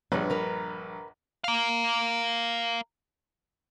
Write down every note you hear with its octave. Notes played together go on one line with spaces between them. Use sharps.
A#1 G2 G#4 B4 C#5
A#4 B4 A#5
A#4 F5